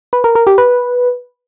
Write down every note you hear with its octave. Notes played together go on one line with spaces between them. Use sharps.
B4
A#4
A#4
G4
B4